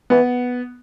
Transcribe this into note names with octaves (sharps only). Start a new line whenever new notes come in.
E3 B3